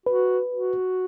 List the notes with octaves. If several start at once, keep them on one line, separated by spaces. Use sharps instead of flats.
F#4 B4
F#4